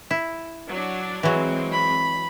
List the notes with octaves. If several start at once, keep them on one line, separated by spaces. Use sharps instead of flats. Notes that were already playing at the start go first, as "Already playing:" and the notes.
E4
F#3 D4
E3 F#3 G#3 C4
B5